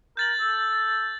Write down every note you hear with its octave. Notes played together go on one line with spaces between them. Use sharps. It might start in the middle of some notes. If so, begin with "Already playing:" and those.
A#4 G6 A6 F#7
A4